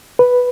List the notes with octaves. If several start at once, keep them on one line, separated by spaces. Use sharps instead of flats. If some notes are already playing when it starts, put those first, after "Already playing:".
B4